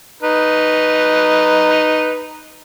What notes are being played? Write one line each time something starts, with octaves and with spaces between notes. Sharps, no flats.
D#4 B4